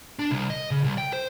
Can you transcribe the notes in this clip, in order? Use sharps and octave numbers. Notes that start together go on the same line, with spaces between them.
D4
C2
D#5
C#3
C2
G5
C5